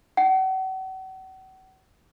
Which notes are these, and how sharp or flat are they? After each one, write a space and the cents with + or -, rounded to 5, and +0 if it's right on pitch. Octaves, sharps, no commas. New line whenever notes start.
F#5 +40